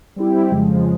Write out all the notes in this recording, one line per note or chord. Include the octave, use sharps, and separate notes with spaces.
G3 C4 E4 G4
F2 C#3 F3 G#3